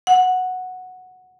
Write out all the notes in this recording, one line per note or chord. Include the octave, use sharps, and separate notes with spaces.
F#5